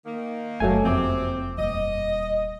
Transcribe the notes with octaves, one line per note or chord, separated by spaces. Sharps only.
D#3 A#3
F#1 F#3 A3 C#4 G#5
F2 C3 C4 D6
D#1 D#5